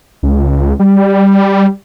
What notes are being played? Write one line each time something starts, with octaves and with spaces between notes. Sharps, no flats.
C#2
G3